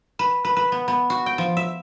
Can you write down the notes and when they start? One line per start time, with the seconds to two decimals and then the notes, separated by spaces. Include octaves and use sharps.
0.19 B4
0.45 B4
0.57 B4
0.72 B3
0.88 B3
1.10 F#4
1.26 G5
1.38 F3
1.57 E5